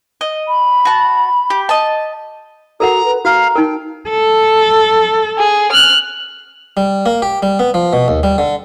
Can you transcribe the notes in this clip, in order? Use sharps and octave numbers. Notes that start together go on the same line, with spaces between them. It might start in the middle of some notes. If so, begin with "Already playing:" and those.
D#5
B5
F#4 A5
G4
D#5 A5
F#4 A4 A#4 F#5 A#5
B4
F#4 F5 A#5
D#4 A#4 G5
A4
G#4
F6 F#6
G3
A#3
G4
G3
B3
F3
B2
D#2
G3
D3